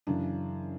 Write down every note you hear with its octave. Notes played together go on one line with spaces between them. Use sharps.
F#2 C#3 E3 D4